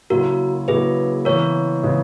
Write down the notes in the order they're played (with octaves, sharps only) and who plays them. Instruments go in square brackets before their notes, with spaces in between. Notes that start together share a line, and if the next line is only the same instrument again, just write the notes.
[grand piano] C#3 F#3 A#3 E4 [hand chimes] F#4 A#4
[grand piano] C#3 F#3 A#3 E4 [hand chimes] G#4 B4
[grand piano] C#3 E3 G#3 B3 [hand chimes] A#4 C#5
[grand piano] C#3 E3 G#3 B3